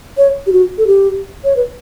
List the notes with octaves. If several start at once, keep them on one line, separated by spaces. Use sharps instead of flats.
C#5
G4
F#4
A4
G4
C#5
B4